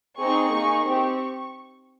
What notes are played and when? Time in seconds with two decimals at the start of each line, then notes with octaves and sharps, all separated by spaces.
0.19 C4 D#4 G#4 C#6
0.53 A#3 D#4 G#4
0.84 C4 G4 C#6